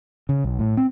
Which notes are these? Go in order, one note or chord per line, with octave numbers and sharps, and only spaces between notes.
C#3
B1
A2
C4